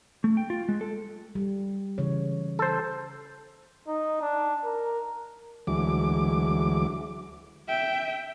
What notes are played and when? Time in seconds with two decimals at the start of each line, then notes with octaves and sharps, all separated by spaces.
0.24 A3
0.37 G5
0.50 F4
0.69 G#3
0.81 A4
1.35 G3
1.98 C#3 E3 C#5
2.59 A4 C5
3.87 D#4
4.21 D4
4.64 A#4
5.67 D2 E3 F#3 G#3 D6
7.68 E5 G5